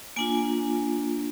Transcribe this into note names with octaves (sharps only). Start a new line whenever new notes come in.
A#3 D4 F4 G#5